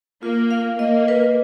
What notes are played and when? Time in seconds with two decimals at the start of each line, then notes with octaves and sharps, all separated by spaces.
0.22 A#3 F4
0.51 F5
0.79 A#3 D#5
1.08 B4